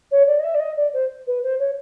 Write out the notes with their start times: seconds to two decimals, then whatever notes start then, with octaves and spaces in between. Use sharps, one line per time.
0.11 C#5
0.26 D5
0.39 D#5
0.43 E5
0.54 D5
0.59 D#5
0.76 D5
0.93 C5
1.26 B4
1.43 C5
1.59 C#5